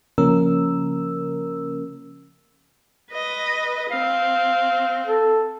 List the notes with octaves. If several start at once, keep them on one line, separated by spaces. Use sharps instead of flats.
C#3 F3 A#3 C#4 A#4 E6
B4 D#5
C4 F5
A4